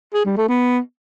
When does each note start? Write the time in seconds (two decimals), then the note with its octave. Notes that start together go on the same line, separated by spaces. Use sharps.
0.14 G#4
0.26 G3
0.37 A3
0.49 B3